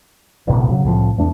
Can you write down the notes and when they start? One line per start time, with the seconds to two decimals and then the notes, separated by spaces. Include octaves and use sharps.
0.47 D1 G#1 C#2 B2
0.69 C#3 F#3
0.85 C2 A2 F3
1.18 E2 A3 D4